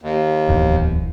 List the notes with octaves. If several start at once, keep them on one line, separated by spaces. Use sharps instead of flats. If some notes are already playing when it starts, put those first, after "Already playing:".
D#2
D1 E2